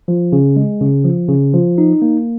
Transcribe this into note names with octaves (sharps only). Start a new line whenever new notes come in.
F3
C#3
G#3
C#3
F3
C#3
F3
D#4
A#3